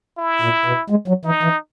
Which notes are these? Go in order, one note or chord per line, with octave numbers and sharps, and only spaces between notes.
E4
A#2
B2
G#3
F#3
E3 D#4
E3